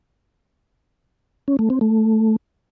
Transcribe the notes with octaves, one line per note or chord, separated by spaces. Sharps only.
C#4
A3
C4
A3